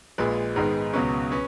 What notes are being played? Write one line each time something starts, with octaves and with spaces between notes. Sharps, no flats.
A#1 A#2 G#3 B4
G#2 D#3 G#3 B3
C#2 B2 F#3 C#4 B4
C#4 B4